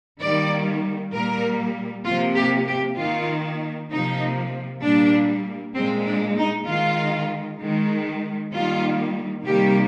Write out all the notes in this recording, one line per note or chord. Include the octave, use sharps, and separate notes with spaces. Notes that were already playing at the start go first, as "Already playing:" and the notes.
D#3 G3 A#3 D5
A#2 G3 A#3 A#4
C3 F3 A#3 F4
G4
G4
D#3 A#3 F4
C3 F3 A#3 D#4
A#2 G3 A#3 D4
A#2 G#3 C4
D4
D#4
D#3 G#3 F4
D#3 G#3
D#3 G3 A#3 F4
C3 D#3 G3 A#3 G4